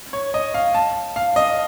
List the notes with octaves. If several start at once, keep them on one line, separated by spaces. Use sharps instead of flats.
C#5
D#5
F5
A5
F5
D#5